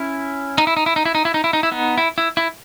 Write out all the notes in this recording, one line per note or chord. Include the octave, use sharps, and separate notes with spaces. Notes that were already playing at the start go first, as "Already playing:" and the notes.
Already playing: C#4 E4
D#4
E4
D#4
E4
D#4
E4
D#4
E4
D#4
E4
D#4
E4
B3 D#4
E4
E4
E4